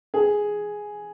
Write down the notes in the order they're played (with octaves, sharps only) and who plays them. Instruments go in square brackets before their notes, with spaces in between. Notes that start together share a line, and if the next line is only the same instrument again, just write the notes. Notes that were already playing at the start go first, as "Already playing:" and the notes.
[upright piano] G#4